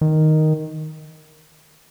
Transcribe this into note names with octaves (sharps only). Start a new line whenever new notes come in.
D#3